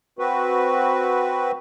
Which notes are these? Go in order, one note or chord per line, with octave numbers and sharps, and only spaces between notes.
C4 F#4 B4